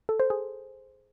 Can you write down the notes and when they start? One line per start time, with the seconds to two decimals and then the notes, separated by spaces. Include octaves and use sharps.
0.09 A4
0.20 C5
0.30 G#4